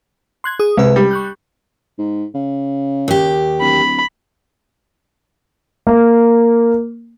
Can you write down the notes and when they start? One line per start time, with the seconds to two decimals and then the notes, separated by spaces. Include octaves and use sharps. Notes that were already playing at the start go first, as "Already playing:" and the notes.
0.44 C6 F#6 G#6
0.59 G#4 D#6
0.77 C2 G#3 B4
0.96 G3
1.11 C#6 F#6 G6
1.98 G#2
2.34 C#3
3.08 D#2 G4
3.60 D1 B5
5.87 A#3